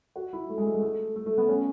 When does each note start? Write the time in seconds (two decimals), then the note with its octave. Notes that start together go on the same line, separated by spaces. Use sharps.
0.16 F#4
0.33 E4
0.49 A3
0.58 G#3
0.66 A3
0.74 G#3
0.82 A3
1.16 A3
1.26 A3
1.38 B3
1.49 C#4